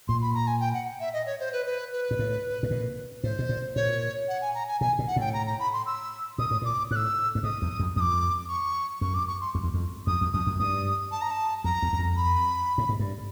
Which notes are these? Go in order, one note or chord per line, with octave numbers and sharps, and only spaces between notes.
A#2 C6
B5
A#5
G#5
G5
F#5
E5
D#5
C#5
C5
B4
B4
B4
A#2
A2
A2
A#2
A2 C5
B2
A#2
A#2 C#5
F#5
G#5
A#5
G#5
B2 G#5
A#2
F#5
A2 G5
A#5
A#5
B5
C6
E6
A#2 D#6
A2
A#2 D6
A2 F#6
E6
G2
G#2 D#6
E2
F2
F2 D6 D#6
C#6
F#2 C#6
D6
C#6
C6
F2
E2
F2
F2 D#6
E2
F2 D#6
F#2
G2 D#6
A5
A#5
A5
F2 A#5
E2
E2
F2
B5
A2
G#2
G2